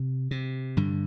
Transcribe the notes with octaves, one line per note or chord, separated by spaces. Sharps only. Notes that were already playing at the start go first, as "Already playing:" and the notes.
Already playing: C3
C3
G2 D3